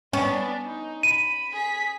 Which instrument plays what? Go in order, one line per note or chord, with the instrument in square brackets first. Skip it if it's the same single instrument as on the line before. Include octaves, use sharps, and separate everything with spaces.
[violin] B3 D4 [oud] C#4
[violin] D#4
[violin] B5 [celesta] D#7
[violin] G#4 B6